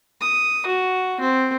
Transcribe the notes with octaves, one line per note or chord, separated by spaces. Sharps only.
D#6
F#4
C4